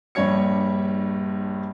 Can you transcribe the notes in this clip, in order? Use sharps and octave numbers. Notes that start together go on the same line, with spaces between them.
A#1 G2 G3 C#5 G#6 C#7